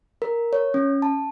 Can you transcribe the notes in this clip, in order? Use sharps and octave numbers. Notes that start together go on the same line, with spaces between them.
A#4
C#5
C#4
A5